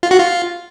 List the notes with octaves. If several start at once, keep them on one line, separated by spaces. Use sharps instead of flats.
F4
F#4
F4